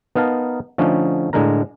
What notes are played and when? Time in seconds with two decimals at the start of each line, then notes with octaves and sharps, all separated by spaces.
0.15 B3 D#4 A#4 F5 A5
0.78 D3 F3 A3 C#4 D#4
1.33 A2 D3 G#3 D4 A#4 A#5